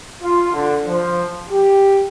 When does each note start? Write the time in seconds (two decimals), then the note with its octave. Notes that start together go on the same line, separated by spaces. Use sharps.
0.23 F4
0.53 D3
0.85 F3
1.50 G4